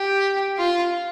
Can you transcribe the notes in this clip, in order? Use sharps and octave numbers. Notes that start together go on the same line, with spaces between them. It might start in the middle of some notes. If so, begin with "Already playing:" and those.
Already playing: G4
F4